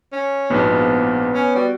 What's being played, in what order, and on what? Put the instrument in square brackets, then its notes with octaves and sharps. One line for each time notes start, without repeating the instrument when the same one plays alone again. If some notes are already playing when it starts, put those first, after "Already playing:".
[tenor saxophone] C#4
[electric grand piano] A#1 G#2 B2 [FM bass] B3
[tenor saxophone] F3
C#4
[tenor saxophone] G3 [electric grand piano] F#4